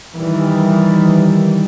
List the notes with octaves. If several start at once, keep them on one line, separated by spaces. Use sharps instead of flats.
D#3 E3 G3